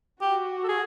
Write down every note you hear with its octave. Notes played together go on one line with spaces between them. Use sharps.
F#4 G4
A4
G#4